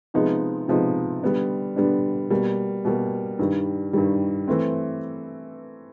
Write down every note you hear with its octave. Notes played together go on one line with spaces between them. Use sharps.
C3 F3 G#3 B3 D#4
C3 F3 G#3 B3 D#4
D3 G3 B3 D4
D3 G3 B3 D4
B2 G3 A#3
B2 G3 A#3
G2 D#3 G3
G2 D#3 G3
E3 A3 C4